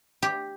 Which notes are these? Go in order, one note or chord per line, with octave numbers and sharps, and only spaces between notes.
G4